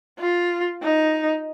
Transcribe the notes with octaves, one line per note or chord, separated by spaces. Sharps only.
F4
D#4